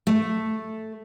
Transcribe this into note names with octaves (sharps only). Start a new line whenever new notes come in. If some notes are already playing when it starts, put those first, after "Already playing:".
A3